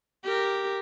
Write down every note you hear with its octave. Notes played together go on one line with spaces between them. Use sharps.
G4 A#4